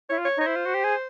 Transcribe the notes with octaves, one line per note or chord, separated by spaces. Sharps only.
E4 C#5
F4
C#5
D#4 C#5
E4 C5
F4
F#4
G4
G#4